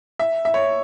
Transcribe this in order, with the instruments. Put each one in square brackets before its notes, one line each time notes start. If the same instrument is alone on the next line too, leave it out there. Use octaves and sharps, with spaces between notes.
[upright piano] E5
E5
C#5